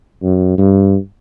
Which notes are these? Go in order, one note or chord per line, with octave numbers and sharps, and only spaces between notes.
F#2
G2